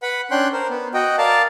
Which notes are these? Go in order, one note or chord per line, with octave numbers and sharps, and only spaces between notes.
B4 F#5 B5
C#4 D4 G5 C6 F#6
A#4 C5
B3
F#4 D#5 G5
A#4 D5 F5 A5